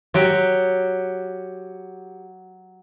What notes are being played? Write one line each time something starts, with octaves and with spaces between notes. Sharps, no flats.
F#3 F#4 G4